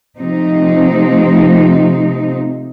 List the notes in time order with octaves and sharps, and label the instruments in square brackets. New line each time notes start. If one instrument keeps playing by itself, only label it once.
[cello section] C3 F3 A3 C4 D#4